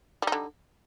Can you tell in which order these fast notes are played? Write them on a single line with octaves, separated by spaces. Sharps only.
G3 D#4 D3